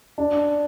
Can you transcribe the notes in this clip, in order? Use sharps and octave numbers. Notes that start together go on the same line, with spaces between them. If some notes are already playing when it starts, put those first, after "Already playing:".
D4